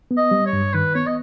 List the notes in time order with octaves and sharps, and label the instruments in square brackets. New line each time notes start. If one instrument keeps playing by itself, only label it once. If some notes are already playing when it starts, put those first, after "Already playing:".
[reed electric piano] B3
[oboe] D#5
[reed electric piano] G3
[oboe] C#5
[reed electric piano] G2
[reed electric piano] D#3 [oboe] B4
[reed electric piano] B3 [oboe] C#5
[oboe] D#5